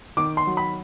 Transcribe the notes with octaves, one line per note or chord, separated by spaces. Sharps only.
D#3 D6
C6
F#3
B5